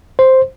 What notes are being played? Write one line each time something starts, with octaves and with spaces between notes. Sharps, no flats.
C5